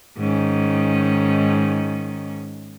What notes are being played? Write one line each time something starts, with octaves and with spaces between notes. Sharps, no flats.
G#2 D#3 C#4